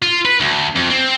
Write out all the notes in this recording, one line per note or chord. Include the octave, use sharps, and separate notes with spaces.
F4
B4
D2
F2
C4